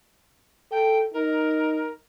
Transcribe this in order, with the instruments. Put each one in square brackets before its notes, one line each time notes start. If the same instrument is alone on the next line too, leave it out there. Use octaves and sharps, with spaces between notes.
[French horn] A4 [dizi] G5
[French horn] D#4 [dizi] A#4